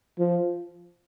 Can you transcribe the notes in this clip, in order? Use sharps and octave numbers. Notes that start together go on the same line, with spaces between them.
F3